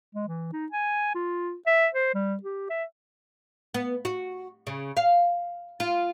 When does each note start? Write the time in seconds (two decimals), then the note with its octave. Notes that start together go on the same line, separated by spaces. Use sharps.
0.15 G#3
0.28 E3
0.53 D#4
0.72 G#5
1.15 F4
1.67 E5
1.94 C5
2.15 G3
2.43 G4
2.70 E5
3.74 B3
4.05 F#4
4.67 C#3
4.97 F5
5.80 F4